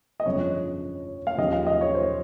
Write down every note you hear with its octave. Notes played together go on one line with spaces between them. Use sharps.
D#5
G1 F2 C#3 F3 C#5
F5
D#2 C#3 F3 D#5
F5
D#5
C#5
C5